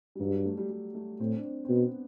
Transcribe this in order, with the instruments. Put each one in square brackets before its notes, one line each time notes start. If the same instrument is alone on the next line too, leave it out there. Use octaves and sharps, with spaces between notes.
[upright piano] G3
[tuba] G2 [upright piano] F#3
[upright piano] G3
A3
G3
G3
A3
[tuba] A2 [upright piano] C4
[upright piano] D4
C4
C4
[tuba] B2 [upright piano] B3